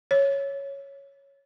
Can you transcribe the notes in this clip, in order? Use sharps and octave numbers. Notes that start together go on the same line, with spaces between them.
C#5